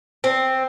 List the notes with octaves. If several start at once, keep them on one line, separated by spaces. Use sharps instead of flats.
C4